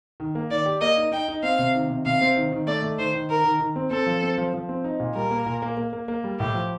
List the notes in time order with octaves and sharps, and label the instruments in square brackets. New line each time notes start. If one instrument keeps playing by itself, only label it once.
[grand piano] D#3
A#3
[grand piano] D#3 [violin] D5
[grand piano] G4
[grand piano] A#3 [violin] D#5
[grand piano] D#4
[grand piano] D#4 [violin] G5
[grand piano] D#4
[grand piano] C4 [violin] F5
[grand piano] C3
D#3
C3
[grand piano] C3 [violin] F5
[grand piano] C4
D#3
D#3
[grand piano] A3 [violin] D5
[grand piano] A3
[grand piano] D#3 [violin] C5
[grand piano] D#3
[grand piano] D#3 [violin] A#4
[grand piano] D#3
D#3
C4
[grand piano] C4 [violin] A4
[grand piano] F3
C4
F3
F3
C4
D#4
A#2
[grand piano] G3 [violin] A#4
[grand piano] A#3
A#2
A#3
A#3
A#3
A#3
G3
[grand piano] A2 [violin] G4
[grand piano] F3